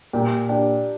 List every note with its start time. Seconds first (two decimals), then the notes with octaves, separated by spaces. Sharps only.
0.13 A#2 G4
0.49 D4 G4